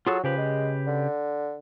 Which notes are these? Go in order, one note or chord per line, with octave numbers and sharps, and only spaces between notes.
F#3 F4 G#4 A4
C#3 F3 G4 B4
G#3
D3